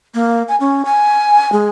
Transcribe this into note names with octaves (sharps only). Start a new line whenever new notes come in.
A#3
G#5
C#4
G#5
G#3